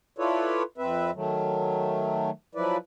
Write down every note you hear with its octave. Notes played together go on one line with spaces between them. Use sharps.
E4 F4 A4 B4 C#5 D5
F2 C4 B4 E5
D#3 F#3 A3
F3 F#3 E4 B4 D5